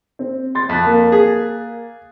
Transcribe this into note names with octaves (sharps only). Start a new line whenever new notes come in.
C4
C6 A6
F2 F#6 B6
A#3
G#4